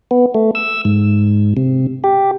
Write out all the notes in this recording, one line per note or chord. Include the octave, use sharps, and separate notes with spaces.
B3
A3
E6
G#2
C3
G4